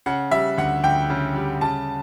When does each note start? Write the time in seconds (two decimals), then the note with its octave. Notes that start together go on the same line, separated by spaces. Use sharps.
0.06 C#3 F#5
0.31 G3 E5
0.58 D2 F#5
0.84 D2 G5
1.10 C#3
1.35 G3
1.61 C#3 A5